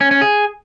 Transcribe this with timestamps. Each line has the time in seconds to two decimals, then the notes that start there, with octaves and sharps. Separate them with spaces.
0.01 C#4
0.11 C#4
0.21 G#4